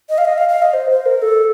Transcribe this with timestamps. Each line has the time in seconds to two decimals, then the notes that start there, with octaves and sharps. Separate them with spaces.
0.09 D#5
0.18 F5
0.25 D#5
0.38 F5
0.49 F5
0.62 D#5
0.74 C5
0.90 C5
1.06 A#4
1.22 A4